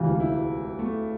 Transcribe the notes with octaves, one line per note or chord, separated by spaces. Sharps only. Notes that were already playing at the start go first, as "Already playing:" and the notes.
Already playing: E1 D2 C3 E3 F4
E4
A3